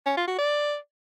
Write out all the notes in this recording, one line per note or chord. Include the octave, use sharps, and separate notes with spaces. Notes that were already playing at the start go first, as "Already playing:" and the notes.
C#4
F4
F#4
D5